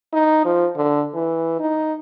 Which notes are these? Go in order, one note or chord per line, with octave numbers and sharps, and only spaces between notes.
D#4
F3
D3
E3
D#4